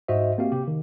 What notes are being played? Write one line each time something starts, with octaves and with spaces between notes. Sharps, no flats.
G#2 F#4 C5 D#5 E5
A#3 C4 F#4 G4 F5
C3 G4
D#3